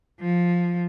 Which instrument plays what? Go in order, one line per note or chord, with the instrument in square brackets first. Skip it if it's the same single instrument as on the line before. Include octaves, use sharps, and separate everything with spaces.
[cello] F3